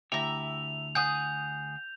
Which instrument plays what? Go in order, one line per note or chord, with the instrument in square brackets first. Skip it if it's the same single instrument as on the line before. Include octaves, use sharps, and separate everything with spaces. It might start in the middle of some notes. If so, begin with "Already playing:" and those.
[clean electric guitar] D2 E4 G4 [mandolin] E5 A#5 [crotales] F7
[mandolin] G#4 F#5 D#6 [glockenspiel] G6